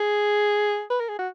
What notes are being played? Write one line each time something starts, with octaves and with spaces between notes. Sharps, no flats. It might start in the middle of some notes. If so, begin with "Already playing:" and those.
Already playing: G#4
B4
A#4
G#4
F#4